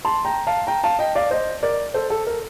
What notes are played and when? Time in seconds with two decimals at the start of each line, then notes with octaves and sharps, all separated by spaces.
0.05 A5 C6
0.25 G5 A#5
0.47 F5 A5
0.67 G5 A#5
0.84 F5 A5
0.99 D#5 G5
1.15 D5 F5
1.31 C5 D#5
1.63 A#4 D5
1.94 A4 C5
2.10 A4
2.27 A#4